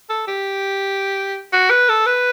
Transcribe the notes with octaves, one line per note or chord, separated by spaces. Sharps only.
A4
G4
F#4
B4
A4
B4